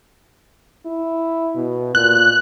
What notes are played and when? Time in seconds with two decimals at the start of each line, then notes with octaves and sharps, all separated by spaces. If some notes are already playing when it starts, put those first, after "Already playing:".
0.86 E4
1.56 B2
1.95 A#2 F#6